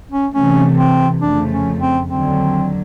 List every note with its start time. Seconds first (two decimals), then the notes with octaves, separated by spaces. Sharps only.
0.12 C#4
0.34 C3 E3 A3 C#4
0.78 C4
1.21 F2 C#3 F3 A3 D4
1.51 C#4
1.80 C4
2.08 D#2 D3 F#3 C4